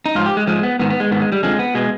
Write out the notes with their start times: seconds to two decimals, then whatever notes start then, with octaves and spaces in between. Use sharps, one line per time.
0.06 D#4
0.15 G#2 F3 F4
0.26 G4
0.37 G#3
0.47 G#2 F3 G#3
0.63 B3
0.79 G#2 D#3 B3
0.90 B3
1.00 G#3
1.11 G#2 D#3 B3
1.22 G#3
1.32 G3
1.43 F2 D3 F3 G#3
1.59 B3
1.75 B2 G#3